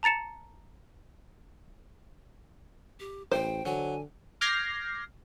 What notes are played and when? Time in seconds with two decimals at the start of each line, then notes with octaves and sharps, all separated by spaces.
0.03 A5 A#5 A6 C#7 E7
3.00 G4
3.32 A1 C5 G5
3.65 D3 F#3 G#5
4.41 D6 F6 G6 G#6 A#6 C7